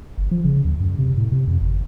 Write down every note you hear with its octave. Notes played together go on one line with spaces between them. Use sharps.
G1
F3
C#3
D#2
F#2
C3
A2
C3
F2
G1